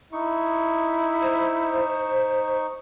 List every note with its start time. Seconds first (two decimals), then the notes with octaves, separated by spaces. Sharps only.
0.13 D#4 E4 C#6
1.22 C5